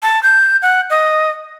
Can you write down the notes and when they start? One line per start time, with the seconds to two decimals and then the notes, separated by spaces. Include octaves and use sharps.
0.03 A5
0.23 G6
0.62 F#5
0.90 D#5